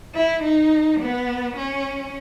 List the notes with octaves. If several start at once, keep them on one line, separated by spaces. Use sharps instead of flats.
E4
D#4
B3
C#4